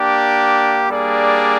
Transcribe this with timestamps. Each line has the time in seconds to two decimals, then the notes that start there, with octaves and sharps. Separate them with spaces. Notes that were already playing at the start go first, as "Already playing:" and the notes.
Already playing: A#3 D4 G4
0.90 G3 A#3 D4 G#4 D5